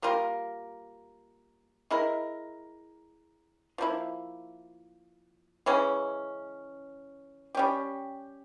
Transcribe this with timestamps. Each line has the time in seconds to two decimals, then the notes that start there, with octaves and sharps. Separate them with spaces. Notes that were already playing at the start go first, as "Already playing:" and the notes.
0.02 G3 A#3 F4 A#4
1.91 G#3 E4 A#4
3.78 F3 A#3 E4
5.66 C#3 E3 G#3 C#4
7.55 G3 C#4 G4